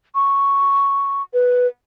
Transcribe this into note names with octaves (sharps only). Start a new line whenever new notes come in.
C#6
B4